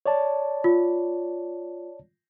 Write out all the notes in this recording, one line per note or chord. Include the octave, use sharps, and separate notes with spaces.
C#5 D5 A5
F4